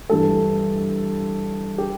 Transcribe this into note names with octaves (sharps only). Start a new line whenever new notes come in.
G2 E3 G3 A4
G4